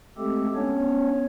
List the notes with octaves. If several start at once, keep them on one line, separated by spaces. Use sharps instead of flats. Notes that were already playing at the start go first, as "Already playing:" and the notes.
G#3 A3 C4 G4 A4
B3 C#4 D4 C#5